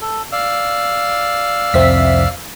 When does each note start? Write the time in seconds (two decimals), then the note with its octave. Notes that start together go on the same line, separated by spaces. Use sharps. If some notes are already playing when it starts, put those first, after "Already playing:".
0.01 A4
0.32 D5 F5 E6
1.74 C2 F2 C4 E5 B6